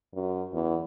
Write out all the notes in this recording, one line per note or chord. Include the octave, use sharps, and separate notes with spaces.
F#2
E2